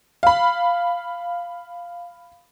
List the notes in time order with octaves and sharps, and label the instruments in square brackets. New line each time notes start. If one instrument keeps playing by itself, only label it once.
[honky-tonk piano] F5 B5